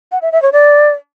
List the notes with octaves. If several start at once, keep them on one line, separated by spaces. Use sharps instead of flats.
F#5
E5
E5
C#5
D5